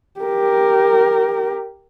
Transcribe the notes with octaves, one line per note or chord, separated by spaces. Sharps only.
G4 A#4